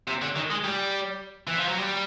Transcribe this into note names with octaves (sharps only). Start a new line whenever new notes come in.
C3
D3
D#3
G#3
G3
E3
F3
F#3
G3